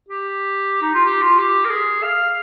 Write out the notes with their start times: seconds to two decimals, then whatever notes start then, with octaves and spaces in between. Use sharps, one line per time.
0.09 G4
0.82 D#4
0.94 F4
1.05 G4
1.22 F4
1.39 G4
1.65 A#4
1.70 G#4
2.03 F5